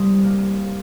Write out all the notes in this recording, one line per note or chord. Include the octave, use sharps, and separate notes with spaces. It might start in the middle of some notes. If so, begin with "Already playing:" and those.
Already playing: C2 G3 C6 D#6
A#3